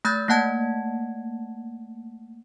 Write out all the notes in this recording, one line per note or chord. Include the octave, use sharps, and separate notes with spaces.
A3 B5 E6 G6 A6
A3 A#3 F#5 A5 G#6